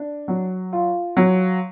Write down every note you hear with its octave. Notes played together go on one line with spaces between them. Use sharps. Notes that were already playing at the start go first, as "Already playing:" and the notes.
Already playing: D4
F#3
F4
F#3